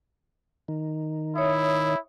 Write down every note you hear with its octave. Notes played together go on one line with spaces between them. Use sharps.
D#3
E4 C#5 E5 D#6